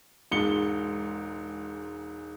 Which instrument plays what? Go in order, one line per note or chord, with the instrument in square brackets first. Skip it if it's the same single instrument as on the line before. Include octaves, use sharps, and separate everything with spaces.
[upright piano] E1 G#2 G#3 C#7 G7